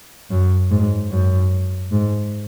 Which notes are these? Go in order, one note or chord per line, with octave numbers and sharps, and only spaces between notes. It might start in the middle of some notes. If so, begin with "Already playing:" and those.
F#2
G#2
F#2
G#2